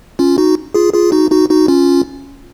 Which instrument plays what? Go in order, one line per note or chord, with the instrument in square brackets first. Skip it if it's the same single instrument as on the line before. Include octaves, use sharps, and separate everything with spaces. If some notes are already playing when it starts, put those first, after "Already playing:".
[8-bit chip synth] C#4 F4
D#4 F#4
F4 G#4
F4 G#4
D#4 F#4
D#4 F#4
D#4 F#4
C#4 F4